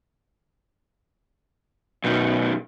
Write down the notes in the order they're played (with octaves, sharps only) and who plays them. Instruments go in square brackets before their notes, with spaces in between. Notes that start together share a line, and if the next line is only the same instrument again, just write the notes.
[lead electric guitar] F#2 D#3 [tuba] B2